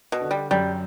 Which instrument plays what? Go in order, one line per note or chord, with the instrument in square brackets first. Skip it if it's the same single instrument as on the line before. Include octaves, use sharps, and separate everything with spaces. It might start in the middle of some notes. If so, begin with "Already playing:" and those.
[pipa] B2
[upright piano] D3
[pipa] G3
[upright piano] F#2 [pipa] G3